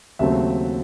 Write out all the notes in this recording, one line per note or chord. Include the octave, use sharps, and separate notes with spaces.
D#2 C#3 F#3 A3 C4 E5